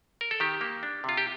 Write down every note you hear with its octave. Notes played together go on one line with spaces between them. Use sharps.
A#4
A4
D#3 G4
A#3
D4
C3 F4
G4